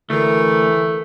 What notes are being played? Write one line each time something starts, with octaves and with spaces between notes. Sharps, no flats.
D2 E3 A3 A#4